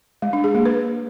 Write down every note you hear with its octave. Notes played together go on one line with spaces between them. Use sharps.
G#3
D4
G#4
A#3
B4